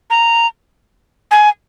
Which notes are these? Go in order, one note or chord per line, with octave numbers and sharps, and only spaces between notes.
A#5
G#5